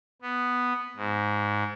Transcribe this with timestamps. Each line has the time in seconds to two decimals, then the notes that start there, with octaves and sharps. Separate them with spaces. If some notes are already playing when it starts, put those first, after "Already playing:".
0.22 B3
0.96 G#2